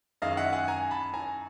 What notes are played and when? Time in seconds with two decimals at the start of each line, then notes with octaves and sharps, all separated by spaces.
0.22 F#2 D#3 G#3 D#5 F5
0.37 E5 F#5
0.53 F#5 G#5
0.68 G#5 A#5
0.91 A5 B5
1.14 G#5 A#5